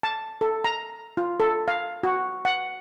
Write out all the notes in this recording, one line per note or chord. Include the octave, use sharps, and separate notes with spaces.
A5
A4
A#5
F4
A4
F5
F#4
F#5